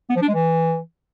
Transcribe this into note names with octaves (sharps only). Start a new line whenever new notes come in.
B3
F3
D4
G#3
E3